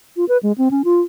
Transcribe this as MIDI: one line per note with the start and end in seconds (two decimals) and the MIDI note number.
0.17 0.25 65
0.29 0.38 71
0.43 0.52 56
0.58 0.69 60
0.71 0.82 61
0.85 1.01 65